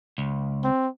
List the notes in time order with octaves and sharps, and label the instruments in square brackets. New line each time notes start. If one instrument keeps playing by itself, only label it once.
[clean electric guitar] C#2
[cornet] C4